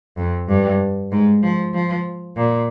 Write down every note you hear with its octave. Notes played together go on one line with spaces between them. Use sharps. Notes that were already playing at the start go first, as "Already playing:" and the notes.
F2
G2
G#2
F3
F3
A#2